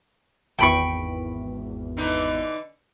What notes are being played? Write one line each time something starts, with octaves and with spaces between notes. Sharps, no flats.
G#1 E2 G5 B5 C#6
D3 E3 D#4